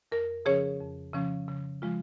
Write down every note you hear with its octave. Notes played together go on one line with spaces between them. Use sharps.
F2 A#4
C#3 F3 C#4 G#4 C#5
F2
C#3 F3 C#4
C#3
F3 G#3 F4